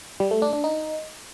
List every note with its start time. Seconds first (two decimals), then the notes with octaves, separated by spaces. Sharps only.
0.20 G3
0.31 A3
0.42 D4
0.53 D4
0.64 D#4